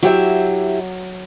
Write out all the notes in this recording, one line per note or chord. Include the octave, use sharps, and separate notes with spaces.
F#3 E4 G4 E5